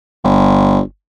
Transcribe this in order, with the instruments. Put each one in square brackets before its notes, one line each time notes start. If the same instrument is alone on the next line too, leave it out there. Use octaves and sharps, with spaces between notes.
[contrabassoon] G1